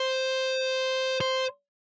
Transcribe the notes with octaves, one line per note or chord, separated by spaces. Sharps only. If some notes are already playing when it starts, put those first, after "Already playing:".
Already playing: C5
C5